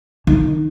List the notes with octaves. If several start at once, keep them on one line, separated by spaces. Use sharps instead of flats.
D#3